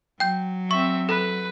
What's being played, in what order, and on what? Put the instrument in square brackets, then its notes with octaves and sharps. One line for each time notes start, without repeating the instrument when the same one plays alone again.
[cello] F#3 [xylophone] G5 G6
[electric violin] C4 E5 [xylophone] C#6
[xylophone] A4 [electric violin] B4